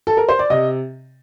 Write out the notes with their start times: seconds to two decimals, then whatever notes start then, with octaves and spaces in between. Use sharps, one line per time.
0.07 A4
0.17 A#4
0.29 C5
0.39 D5
0.50 C3 D#5